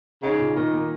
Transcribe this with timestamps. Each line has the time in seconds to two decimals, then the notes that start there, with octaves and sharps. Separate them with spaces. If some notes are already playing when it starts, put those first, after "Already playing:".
0.23 C#3 D#4
0.39 A#2
0.56 A#2 D#3
0.74 A#3